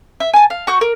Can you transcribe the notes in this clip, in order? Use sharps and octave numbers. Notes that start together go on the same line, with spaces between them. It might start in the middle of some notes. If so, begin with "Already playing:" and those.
E5
G#5 A5
F5
F#4 C#6 G6
A#4